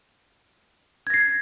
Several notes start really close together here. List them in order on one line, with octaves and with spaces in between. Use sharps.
G#6 A#6 C7